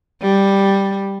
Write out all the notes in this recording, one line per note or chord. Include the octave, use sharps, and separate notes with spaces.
G3